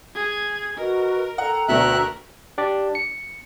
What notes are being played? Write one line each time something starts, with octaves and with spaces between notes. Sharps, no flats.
G#4 G#6
F#4 A#4 B4 D#5
A4 F#5 G5 A#5
D2 B2 A3 D4 A#4 E5 F#6
D4 G4 D5
C#7